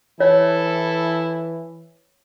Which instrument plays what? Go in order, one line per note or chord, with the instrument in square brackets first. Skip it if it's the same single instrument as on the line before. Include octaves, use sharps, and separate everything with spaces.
[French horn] E3 [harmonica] E4 A4 [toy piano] C#5